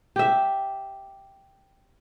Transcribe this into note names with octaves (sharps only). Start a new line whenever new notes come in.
G4 E5